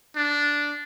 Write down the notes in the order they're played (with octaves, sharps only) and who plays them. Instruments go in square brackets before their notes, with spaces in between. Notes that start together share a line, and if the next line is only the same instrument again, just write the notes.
[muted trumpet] D4